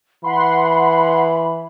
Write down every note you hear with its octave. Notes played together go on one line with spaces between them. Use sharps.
E3 F#5 B5 C6